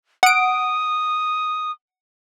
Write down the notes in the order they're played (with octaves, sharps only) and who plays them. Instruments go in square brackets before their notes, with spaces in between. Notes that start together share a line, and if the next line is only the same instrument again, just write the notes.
[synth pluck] F#5 D7 [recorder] D#6